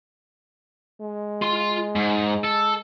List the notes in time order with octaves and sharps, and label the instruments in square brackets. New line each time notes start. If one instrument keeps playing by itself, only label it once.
[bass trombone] G#3
[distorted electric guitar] F4 C6
G#2
A4